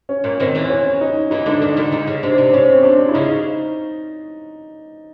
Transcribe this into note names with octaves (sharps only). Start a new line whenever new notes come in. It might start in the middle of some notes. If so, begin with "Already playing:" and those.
C#4
A#2
D#2 D#3 C4
E2 E3
C#4
D#4
E2 E3 D#4
D2 D3 D4
D#2 D#3
D2 D3
D2 D3 D#4
C#3
C3 D4
C3
C3 C#4
C4
D4
E4
C#3 D#4